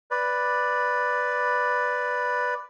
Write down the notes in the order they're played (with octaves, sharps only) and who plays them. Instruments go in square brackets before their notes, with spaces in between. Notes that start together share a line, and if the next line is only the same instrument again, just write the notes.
[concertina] B4 D5